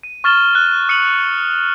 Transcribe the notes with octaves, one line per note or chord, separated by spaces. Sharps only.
D#7
C#6 F6 A6 E7 G7
F#6
D#6 C#7 D#7 F7 F#7